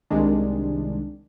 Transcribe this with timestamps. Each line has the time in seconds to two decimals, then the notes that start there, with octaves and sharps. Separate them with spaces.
0.10 C2 C3 D#3 G#3 D4